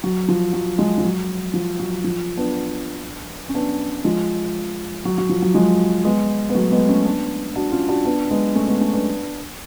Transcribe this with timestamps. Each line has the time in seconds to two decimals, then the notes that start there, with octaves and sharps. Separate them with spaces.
0.04 F#3
0.28 F3
0.53 F#3
0.78 F3 G#3
0.98 F3
1.04 F#3
1.54 F3
1.79 F#3
2.04 F3
2.37 B3 D4
3.49 C#4
3.54 B3 D4
4.04 F3 G#3
5.05 F#3
5.18 F#3
5.29 F3
5.42 F#3
5.54 F3 G#3
6.05 G#3 B3
6.49 B3
6.55 F#3 A3
6.72 G#3 B3
6.89 A3 C#4
7.06 B3 D4
7.56 D4 F#4
7.72 C#4 F4
7.89 D4 F#4
8.05 B3 D4
8.31 G#3 B3
8.55 A3 C#4
8.68 G#3 B3
8.81 A3 C#4
8.93 B3 D4